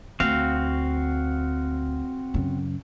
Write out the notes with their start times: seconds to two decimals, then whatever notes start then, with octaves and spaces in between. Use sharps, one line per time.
0.20 D2 C4 F#4 F5
2.34 F#2 C#3